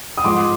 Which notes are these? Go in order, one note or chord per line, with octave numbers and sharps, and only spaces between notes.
D#6
G#2 F3 G#3 C6 D6